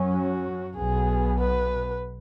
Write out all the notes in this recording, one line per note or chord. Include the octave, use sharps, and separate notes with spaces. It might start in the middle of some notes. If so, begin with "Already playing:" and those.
Already playing: F#2 F#3 C#4
F#4
B1 B2 B3 G#4
B4